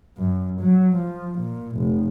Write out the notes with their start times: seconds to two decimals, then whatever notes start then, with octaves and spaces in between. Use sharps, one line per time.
0.18 F#2
0.61 F#3
0.97 F3
1.39 A#2
1.77 F1